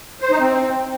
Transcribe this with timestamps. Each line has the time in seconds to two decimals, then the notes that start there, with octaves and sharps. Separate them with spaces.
0.21 C5
0.31 D#4
0.40 C4